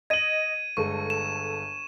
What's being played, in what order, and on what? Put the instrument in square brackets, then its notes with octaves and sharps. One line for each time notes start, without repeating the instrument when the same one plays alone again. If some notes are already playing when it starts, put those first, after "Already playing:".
[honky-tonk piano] D#5 F#7 [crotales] G#6 D#7
[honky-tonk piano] G1 G#3 A4 [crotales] C#6
[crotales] E7